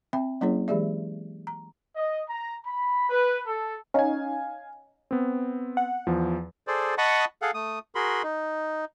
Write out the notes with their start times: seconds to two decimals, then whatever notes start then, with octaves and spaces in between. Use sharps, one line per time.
0.13 C4 E5 G5 B5
0.41 F#3 A#3 C#4 E4 G#4 C#5
0.68 E3 G#3 G4 G#4 D5 E5
1.47 A#5
1.96 D#5
2.29 A#5
2.66 B5
3.10 B4
3.47 A4
3.94 C#4 D#4 F5 G#5
5.11 B3 C4
5.77 F#5
6.07 E2 F3
6.67 G#4 A4 C5 D5
6.98 D#5 F#5 A5 B5 C#6 D#6
7.42 G#4 A4 F5 F#5
7.54 A3 D#6
7.95 F#4 G#4 A#4 B5 C6
8.23 D#4